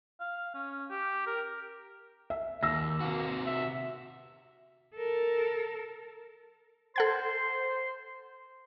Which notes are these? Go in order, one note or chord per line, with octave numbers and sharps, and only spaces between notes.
F5
C#4
G4
A#4
E5
D#2 E6 A#6
C3 A#3 F#4
E5
A4 A#4
A4 C5 F#5 C6 G#6